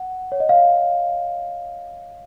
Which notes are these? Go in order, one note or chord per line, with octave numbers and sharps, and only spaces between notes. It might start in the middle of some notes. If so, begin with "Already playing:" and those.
Already playing: F#5
C#5
D#5
F5